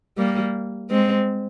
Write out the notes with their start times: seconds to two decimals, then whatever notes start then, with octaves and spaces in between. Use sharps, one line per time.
0.17 G3 A#3
0.90 G#3 C4